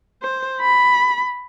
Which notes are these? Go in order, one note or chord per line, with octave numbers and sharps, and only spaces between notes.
C5
B5